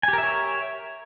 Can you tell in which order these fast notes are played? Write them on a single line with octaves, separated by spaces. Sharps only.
G#5 G4 A#4 E5 C#5